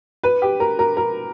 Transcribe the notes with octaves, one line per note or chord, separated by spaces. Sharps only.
B4
G4
A#4
A#4
A#4